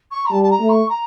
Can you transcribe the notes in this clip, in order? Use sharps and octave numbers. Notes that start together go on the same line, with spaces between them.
C#6
A#5
G3 A5
A5
A#5
A3
C#6
A#5